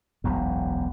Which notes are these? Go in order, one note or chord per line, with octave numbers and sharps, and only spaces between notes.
E1 B1 F#2